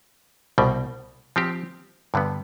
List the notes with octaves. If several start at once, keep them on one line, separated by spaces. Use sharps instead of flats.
C2 B2 G3
F3 C4 G4
G2 D3 G3 B3